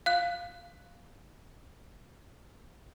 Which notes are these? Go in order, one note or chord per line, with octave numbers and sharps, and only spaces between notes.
F5 F#6